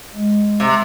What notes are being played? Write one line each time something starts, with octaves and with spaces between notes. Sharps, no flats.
G#3
C3